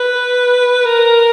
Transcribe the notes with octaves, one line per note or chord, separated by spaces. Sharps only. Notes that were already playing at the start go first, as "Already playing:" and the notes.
Already playing: B4
A#4